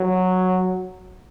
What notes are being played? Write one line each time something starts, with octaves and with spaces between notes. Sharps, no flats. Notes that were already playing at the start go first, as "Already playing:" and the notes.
Already playing: F#3